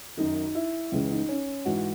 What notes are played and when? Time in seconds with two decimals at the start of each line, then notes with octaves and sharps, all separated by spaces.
0.17 F#2 D#3 D#4
0.55 E4
0.92 C#2 C#3 E3
1.11 D#4
1.29 C#4
1.65 G#2 E3 F#4